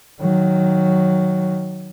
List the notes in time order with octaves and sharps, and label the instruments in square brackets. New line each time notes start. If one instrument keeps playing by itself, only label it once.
[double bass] D#3 F#3